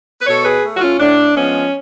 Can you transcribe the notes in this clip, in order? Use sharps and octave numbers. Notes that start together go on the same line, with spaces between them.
B4
B2 A4 C#5
G#4 B4
A3
F#4
C#4 F4
A2 D4
F3 G#3 B3 C#4